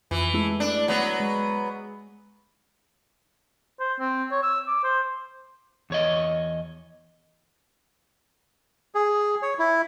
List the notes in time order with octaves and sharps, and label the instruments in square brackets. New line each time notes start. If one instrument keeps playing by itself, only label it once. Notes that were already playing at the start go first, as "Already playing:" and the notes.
[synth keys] F2 [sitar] E3
[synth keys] G#3 A3 E4
[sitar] D4
F#3 B3
[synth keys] G#3
[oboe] C5
C4
C#5
E6
D6
C5
[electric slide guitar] E2 C#5 D#5
[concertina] G#4
C#5
E4